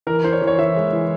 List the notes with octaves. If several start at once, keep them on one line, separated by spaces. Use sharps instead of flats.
E3 A#4
E3 C5
C#5
E3
C#5
E3 E5
G#3
E3